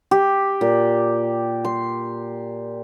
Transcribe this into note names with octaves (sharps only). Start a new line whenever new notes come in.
G4
A#2
C6